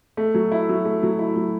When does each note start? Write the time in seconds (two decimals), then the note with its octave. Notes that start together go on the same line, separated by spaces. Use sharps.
0.17 A3
0.34 F#3
0.52 E4
0.69 F#3
0.85 A3
1.03 F#3
1.19 E4
1.36 F#3